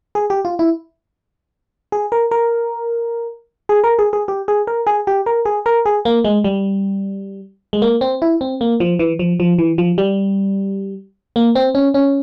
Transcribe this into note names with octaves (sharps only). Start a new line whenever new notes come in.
G#4
G4
F4
E4
G#4
A#4
A#4
G#4
A#4
G#4
G#4
G4
G#4
A#4
G#4
G4
A#4
G#4
A#4
G#4
A#3
G#3
G3
G#3
A#3
C4
E4
C4
A#3
F3
E3
F3
F3
E3
F3
G3
A#3
C4
C#4
C#4